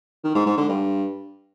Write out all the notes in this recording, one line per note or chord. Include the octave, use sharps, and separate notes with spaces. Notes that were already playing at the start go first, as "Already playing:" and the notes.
D#3
G#2
G#2
D3
G2